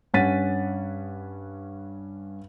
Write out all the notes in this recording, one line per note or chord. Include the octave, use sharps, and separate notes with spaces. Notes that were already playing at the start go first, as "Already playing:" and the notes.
G2 C#4 F#5 A6 B6 D#7